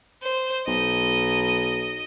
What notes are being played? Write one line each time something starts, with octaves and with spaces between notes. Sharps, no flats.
C5
B1 D#5